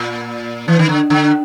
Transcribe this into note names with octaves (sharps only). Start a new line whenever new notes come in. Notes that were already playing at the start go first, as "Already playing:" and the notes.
Already playing: A#2
E3
D#3
D3
D3